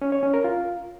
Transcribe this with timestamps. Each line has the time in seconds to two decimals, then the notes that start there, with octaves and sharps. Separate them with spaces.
0.02 C#4
0.12 C#5
0.23 C#4
0.34 A#4
0.44 F4